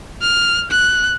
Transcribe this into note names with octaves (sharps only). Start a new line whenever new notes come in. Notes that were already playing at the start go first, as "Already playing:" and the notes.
F6
F#6